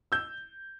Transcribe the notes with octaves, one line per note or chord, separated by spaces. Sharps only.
E6 G6